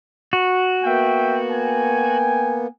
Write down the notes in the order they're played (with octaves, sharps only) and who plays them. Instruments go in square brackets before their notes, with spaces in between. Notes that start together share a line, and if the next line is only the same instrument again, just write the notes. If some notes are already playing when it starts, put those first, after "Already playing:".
[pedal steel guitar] F#4
[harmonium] A#3 B3 [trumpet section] E5 G5
[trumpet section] G5 G#5